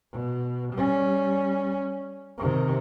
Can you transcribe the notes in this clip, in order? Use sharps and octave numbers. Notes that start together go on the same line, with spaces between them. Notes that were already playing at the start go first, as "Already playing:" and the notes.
B2
G3 C#4
C3 D#3